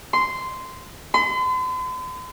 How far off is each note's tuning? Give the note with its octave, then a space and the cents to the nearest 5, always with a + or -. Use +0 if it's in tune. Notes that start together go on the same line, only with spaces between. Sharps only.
C6 -10
C6 -45